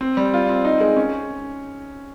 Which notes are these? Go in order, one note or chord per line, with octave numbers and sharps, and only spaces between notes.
C4
G3
F4
C4
D#4
G#3
C#4